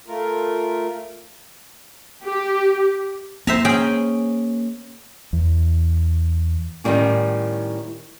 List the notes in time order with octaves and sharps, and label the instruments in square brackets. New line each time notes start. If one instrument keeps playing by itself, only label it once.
[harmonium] A3 F4 A#4
[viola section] G4
[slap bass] A#3 [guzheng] C5 E5 A#5
[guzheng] C#4 G#4 G5
[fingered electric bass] E2
[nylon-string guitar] A2 D#3 E3 G3 A#3 C#4